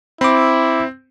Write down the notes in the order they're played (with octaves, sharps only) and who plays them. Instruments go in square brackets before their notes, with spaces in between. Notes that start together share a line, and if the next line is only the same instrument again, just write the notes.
[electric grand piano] C4 [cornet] E4 [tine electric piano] B5 D6